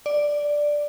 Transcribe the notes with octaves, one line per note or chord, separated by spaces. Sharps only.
D5